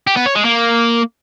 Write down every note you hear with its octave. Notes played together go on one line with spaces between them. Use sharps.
G4
B3
C#5
G#3
A#3